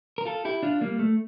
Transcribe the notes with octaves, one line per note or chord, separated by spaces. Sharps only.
A#4
F4 A4
E4 G4
D4 F4
G3 A#3
A3